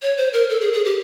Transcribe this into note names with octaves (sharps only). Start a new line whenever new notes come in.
C#5
C5
A#4
A4
G#4
G#4
G4